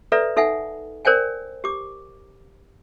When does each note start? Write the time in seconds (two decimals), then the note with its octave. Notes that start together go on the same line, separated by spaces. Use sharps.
0.12 A4 B4 D5 E5 A#5
0.36 D#4 A4 E5 F#5 G#5
1.05 A#4 C5 D5 G5 G#5
1.64 G4 D6